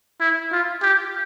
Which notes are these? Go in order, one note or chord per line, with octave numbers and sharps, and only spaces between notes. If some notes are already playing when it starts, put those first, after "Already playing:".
E4
F4
G4